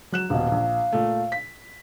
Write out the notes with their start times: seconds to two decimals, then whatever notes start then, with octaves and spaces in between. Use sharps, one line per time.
0.12 F#3 F#6 E7
0.30 D#1 B2 F5
0.51 A#1
0.92 A#2 A3
1.32 B6